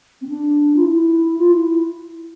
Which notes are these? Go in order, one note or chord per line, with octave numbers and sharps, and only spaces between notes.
C4
D4
F4
E4
F4
E4
E4